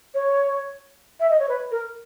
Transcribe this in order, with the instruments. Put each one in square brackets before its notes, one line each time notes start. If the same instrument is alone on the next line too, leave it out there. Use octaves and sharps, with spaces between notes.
[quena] C#5
E5
D#5
C#5
B4
A#4